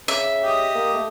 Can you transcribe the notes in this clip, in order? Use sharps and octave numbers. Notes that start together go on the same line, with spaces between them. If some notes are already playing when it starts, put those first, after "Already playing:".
C#3 E5
G4 D#5
A#3
A3